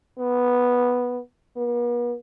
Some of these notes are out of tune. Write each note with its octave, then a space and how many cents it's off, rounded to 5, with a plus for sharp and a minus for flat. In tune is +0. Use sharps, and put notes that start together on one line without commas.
B3 -5
B3 -45